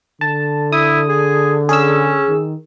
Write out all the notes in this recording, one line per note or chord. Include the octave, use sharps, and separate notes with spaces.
D3 A5
E4 D#6
G#4
C#4 G#4 E6
D#3